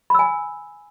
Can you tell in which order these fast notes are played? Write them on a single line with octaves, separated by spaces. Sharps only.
B5 E6 G#5